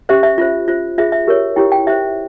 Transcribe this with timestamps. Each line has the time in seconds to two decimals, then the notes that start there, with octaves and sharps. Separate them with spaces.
0.09 C#4 G4 C5 E5
0.23 E5
0.38 F4 C5
0.68 F4 C5
0.98 F4 G#4 C5 E5
1.12 E5
1.27 G4 A#4 C#5
1.56 E4 G4 C#5 G5
1.72 G5
1.87 G4 C5 E5